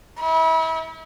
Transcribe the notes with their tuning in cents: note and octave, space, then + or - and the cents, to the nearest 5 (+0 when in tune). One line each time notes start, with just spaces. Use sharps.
E4 -35